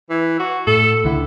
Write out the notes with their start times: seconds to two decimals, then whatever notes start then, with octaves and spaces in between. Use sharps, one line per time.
0.10 E3
0.39 F#4
0.67 A2 A4
1.04 C#2 D3 E4